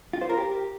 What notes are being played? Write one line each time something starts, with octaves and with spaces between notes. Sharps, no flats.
F4
C5
A#4
G4